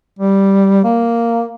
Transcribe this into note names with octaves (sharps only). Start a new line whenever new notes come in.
G3
A#3